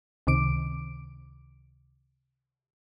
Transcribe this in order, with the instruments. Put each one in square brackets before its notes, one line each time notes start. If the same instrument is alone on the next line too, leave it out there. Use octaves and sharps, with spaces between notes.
[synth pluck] C#2 C3 D#3 D6 D7